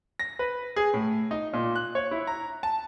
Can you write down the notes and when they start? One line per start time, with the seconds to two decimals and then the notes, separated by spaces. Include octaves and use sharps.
0.19 A#6
0.39 B4
0.76 G#4
0.94 A2
1.31 D#4
1.53 A#2
1.75 F#6
1.95 C#5
2.11 E4
2.27 A#5
2.63 A5